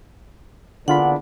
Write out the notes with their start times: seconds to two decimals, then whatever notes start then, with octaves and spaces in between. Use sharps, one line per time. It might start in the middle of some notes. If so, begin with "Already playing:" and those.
0.88 E2 A#2 D3 D4 F4 F#5 B5